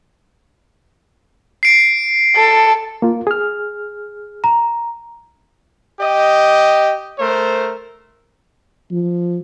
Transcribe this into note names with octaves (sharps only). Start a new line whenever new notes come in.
C7 D7
A4
A#3 F4
G#4 F6
A#5
G4 D#5
A3 A#4 C5
F3